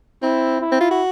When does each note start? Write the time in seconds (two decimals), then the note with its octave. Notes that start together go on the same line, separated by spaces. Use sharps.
0.22 C4 E4
0.61 E4
0.72 C4
0.80 F4
0.91 F#4